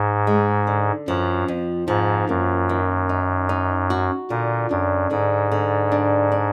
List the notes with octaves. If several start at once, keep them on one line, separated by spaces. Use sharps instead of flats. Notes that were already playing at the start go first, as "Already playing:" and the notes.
Already playing: G#2
G#3
D3
F#2 F3
F2
G#2 F3
F#2 A#3
D#3
D#4
D#4
F#4
A#2 D3
F#2 D4
G#2 D3
D3
D4
D4